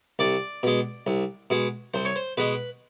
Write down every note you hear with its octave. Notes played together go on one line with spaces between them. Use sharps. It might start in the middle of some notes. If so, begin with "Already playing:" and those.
C2 D5
B2 G#3
C2
B2 G#3
C2 C5
C#5
C5
B2 G#3 B4